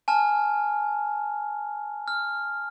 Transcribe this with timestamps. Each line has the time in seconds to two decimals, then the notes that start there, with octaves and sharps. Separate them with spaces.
0.08 G#5 A5 F6
2.08 F6